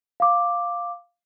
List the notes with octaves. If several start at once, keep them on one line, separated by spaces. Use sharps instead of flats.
F5 D6